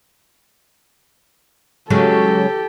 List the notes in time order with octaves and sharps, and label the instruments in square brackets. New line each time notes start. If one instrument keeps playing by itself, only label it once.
[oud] C#3 F#3 G#3 [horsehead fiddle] G4 A4